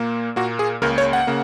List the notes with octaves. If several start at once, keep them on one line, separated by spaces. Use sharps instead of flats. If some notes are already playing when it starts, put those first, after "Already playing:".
Already playing: A#2 A#3
A#2 A#3 F#4
G#4
C#2 C#3 A#3 A#4
C#5
F#5
C#3 A#3